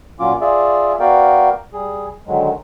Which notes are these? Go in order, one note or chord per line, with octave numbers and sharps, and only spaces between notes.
A#2 F#3 C#4 F4 D6
F4 G#4 D5 E5
B3 F#4 A#4 D5 F5 G5
G3 G#4
D3 D#3 F#3 G#3